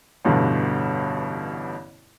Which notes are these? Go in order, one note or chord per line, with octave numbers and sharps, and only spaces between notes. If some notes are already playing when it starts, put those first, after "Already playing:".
A1 G2 B2 D3